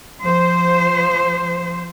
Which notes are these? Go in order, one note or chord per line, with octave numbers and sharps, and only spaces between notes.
F3 C5